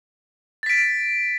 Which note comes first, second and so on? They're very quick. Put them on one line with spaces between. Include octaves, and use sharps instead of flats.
A6 B6 D7